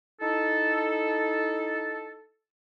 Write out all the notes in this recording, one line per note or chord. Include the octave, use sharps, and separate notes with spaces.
D#4 E4 A4